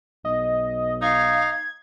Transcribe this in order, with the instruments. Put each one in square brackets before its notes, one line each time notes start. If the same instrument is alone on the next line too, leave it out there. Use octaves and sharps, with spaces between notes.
[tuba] B1 [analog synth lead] D#5
[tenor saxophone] D#4 [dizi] F5 [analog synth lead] G#6